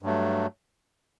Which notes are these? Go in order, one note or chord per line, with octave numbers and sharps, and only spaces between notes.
G2 F#3 A3